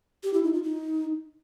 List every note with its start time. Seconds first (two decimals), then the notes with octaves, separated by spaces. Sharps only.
0.23 G4
0.33 E4
0.43 D#4
0.53 F4
0.63 D#4